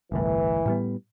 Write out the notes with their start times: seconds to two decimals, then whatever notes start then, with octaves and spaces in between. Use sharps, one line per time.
0.12 G1 C2 A2 E3
0.66 A2 G3 B3